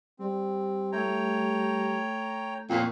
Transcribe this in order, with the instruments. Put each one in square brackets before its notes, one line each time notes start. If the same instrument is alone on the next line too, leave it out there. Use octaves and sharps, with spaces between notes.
[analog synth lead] G3 [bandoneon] C4
[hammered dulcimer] A3 [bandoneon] C#5 G5 A#5
[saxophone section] F2 A#2 [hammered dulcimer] F4 A#4 C#5